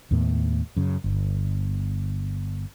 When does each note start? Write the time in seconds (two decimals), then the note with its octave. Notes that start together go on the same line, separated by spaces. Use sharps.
0.11 D#2 A2 B3
0.77 F#2 C#3
1.04 G1